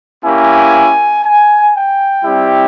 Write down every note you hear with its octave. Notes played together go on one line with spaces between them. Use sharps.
A#3 C#4 E4 G4 G#5
G#5
G5
G3 C4 E4 G4